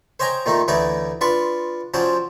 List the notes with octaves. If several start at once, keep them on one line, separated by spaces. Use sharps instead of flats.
C5 C#5 D#5 G5 G#5 A#5
A#2 D#3 A3 D#4
D2 E3 D#4 C#5 D5
D4 F4 B4 C#6
F3 F#3 C#4 C5 D5